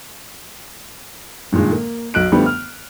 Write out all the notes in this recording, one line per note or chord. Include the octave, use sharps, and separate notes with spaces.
G2 A#2 D#3 G#3
A#3
B1 F#3 F#6 D7
D3 F3 G3 A3 B3
F6